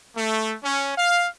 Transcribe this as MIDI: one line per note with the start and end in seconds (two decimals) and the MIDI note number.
0.16 0.56 57
0.63 0.95 61
0.98 1.24 77